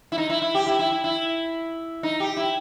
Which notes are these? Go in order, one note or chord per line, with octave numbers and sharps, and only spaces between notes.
E4
D#4
E4
E4
G4
E4
E4
E4
E4
D#4
G4
E4